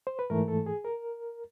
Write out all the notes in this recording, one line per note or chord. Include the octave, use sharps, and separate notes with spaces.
C5
B4
G#2 E3 A3 A#4
A4
G#4
A#4